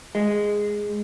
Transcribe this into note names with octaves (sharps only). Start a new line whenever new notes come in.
G#3